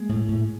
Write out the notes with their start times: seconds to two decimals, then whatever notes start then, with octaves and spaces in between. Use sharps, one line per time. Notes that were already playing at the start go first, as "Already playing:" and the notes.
Already playing: G#3 A#3
0.09 A2
0.29 A2